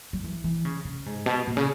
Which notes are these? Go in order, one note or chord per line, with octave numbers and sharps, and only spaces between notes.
F#3
E3
E3
C#3
C#3
G#2
B2
A#2
C#3